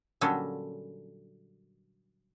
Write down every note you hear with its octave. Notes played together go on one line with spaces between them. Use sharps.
A#2 D3 F#3 G3 C#4 A4